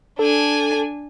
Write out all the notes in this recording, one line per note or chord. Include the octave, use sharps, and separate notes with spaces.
D4 A4 G#5